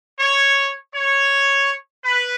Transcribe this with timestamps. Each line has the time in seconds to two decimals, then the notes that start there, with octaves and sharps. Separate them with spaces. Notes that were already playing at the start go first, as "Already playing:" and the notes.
0.19 C#5
0.93 C#5
2.04 B4